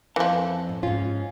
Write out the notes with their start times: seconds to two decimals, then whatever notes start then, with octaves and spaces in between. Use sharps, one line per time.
0.16 F2 E3 F3 A4
0.69 A2
0.83 G#2 C#4 F4